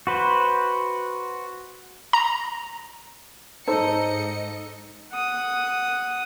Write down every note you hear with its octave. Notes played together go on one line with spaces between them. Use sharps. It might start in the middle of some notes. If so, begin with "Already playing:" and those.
F#4 B4 C5
A#5
G#2 D#4 A4 C5 D#5 C#7
F#5 D#6